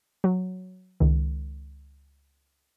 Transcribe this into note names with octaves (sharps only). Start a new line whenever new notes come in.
F#3
C#2 D#3